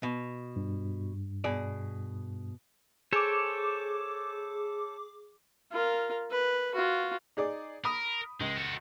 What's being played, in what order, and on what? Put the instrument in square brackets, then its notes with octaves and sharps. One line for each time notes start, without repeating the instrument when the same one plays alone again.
[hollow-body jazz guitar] B2
[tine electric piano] G2
[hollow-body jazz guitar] B2 G#4 D5
[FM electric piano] G#4 D6 [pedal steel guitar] A4 C5 C#5
[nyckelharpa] F4 A#4
B4
F4 F#4
[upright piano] D#4 G#4 D5
[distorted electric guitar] A#4 [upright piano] B5 D#6
[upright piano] C#2 [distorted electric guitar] G#3
[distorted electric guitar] F#4 A4